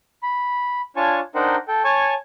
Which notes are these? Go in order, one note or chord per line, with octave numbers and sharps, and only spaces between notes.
B5
D4 F4 C#5 G#5 A5 C#6
D4 D#4 A#4 C5 F#5 G5
A4 G5
C#5 G#5 A5 C#6